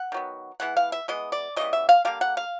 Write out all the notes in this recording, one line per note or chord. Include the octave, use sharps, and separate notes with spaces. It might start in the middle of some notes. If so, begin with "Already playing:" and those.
Already playing: F#5
D#3 F#3 B3
E3 G#3 B3 F#5
F5
E5
E3 G#3 B3 D#5
D5
C#3 E3 G3 B3 D#5
E5
F5
D3 G3 A#3 F5
F#5
F5